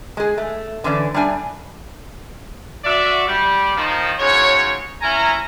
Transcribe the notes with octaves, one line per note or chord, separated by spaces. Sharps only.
G#3 G#4
A3
D3 E3 C#4 D5
G3 A3 D4 G#5
F#4 D5 E5
G3
D#3 F3
G#2 C#3 F#4 C#5
C#4 E4 A#4 G#5 A#5